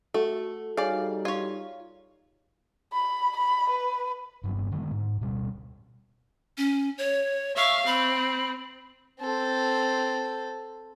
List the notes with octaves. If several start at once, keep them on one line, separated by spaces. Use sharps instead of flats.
A3 F#4 A4
G3 D#4 G#4 C#5 D5 F5 G#5
F4 C#5 D5 F5
B5
B5
B4
G1 G2 F#3 B3
D3 D#3 G#3 B3
G#2
D1 B2 G3
C#4
C#5
E5 F5 C#6
C4 B5
C4 A4